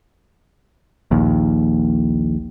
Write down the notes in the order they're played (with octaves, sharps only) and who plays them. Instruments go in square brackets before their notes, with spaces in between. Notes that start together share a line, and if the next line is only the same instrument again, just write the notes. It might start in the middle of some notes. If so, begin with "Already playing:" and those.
[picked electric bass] A#1 D#2